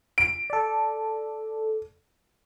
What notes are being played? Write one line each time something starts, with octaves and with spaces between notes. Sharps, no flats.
D7
A4 D5